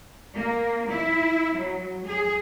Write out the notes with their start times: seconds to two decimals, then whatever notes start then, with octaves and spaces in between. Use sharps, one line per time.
0.34 A#3
0.89 E4
1.57 F#3
2.06 G#4